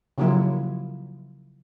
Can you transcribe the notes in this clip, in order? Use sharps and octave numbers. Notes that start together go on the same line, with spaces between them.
C#3 F3 F#3 A#3 E4 F4